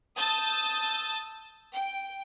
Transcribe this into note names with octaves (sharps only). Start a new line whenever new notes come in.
A5 D#6 E6 G6 A6
G5